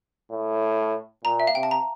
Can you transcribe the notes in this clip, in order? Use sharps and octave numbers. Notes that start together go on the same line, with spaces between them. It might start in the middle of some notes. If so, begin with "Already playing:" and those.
A2
A#2 A#5
E5
F5
C3 G5
A5
A#5